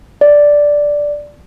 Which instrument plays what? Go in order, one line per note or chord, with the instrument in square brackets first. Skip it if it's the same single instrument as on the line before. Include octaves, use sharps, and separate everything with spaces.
[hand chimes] D5